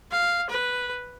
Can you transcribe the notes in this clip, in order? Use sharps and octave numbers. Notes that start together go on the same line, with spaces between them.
F5
B4